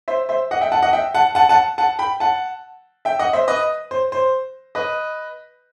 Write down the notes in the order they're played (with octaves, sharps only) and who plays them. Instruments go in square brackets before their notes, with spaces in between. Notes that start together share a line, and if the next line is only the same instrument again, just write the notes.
[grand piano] C5 E5
C5 E5
D#5 F#5
E5 G5
F#5 A5
D#5 F#5
E5 G5
F#5 A5
F#5 A5
F#5 A5
F#5 A5
G5 B5
F#5 A5
E5 G5
D#5 F#5
C5 E5
B4 D#5
C5
C5
B4 D#5